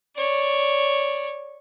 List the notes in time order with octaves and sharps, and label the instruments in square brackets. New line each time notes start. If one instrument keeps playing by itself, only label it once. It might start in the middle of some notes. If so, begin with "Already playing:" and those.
[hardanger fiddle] C#5 D5